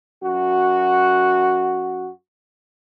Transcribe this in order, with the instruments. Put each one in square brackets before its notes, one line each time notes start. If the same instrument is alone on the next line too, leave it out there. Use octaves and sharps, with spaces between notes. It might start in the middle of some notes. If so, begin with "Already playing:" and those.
[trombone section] F#2 F#4